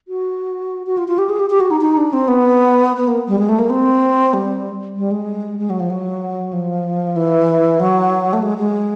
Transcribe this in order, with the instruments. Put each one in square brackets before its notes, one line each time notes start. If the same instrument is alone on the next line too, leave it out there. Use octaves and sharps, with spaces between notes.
[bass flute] F#4
F#4
F4
F4
G4
G#4
G4
G4
F#4
D#4
D#4
D4
C4
B3
B3
A#3
G3
G#3
A3
A#3
C4
G3
G3
G#3
G#3
F#3
F3
F#3
F3
E3
F#3
A3
G#3
G#3